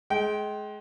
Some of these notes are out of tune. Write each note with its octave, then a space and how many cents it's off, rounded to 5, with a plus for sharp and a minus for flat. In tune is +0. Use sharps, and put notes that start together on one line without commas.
G#3 +25 G5 -20